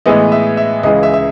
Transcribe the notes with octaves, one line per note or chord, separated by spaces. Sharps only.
A2 E3 G#3 B3 D#5
E5
E5
C#2 C#3 E3 G#3 D#5
E5
E5